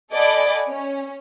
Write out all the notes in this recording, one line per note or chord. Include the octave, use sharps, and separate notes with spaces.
A4 D5 D#5 F#5 G#5 B5
C#4